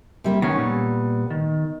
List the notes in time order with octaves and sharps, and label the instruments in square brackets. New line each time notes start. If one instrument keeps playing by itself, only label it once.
[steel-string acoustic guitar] C3 G3 A#3
[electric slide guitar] D#3 C#4 [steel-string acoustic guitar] B3
[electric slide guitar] A#2 G3
D#3